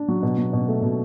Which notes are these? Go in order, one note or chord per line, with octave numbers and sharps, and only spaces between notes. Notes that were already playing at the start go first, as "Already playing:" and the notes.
Already playing: D4
F#3
B2
F#3
B2
A3
B2